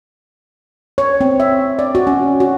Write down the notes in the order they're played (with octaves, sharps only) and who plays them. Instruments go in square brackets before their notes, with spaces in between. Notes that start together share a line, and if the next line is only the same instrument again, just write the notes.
[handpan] C#5
C4
E5
D5
F#4
C#4
F#4